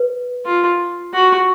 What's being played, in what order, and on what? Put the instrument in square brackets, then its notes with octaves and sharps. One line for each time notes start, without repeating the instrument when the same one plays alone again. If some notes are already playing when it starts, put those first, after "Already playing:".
Already playing: [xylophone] B4
[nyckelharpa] F4
F#4